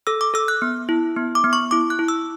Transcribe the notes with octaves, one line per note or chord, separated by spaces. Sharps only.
A4 E6
D6
A4 E6
F#6
B3
E4
B3
D6
B3
C#6
E4 D6
F#6
E4
E6